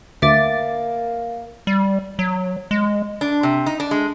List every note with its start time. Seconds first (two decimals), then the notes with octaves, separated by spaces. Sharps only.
0.22 D2 A#3 E5 D6 A6
1.67 G3
2.19 F#3
2.71 G#3
3.21 D4
3.43 C3
3.66 D#4
3.80 D4
3.91 G#3